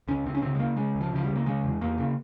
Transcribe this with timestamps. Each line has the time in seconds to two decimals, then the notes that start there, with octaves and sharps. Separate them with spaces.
0.08 C#2 C#4
0.25 C#2 C4
0.35 C#4
0.42 C#3 C4
0.55 G#3
0.59 C#3 A#3
0.77 C#3 G#3
0.95 C#2
1.01 F3
1.12 C#3 F3
1.24 C#2 G3
1.36 A#3
1.46 C#3 G#3
1.64 E2
1.81 E2 A#3
1.98 C#3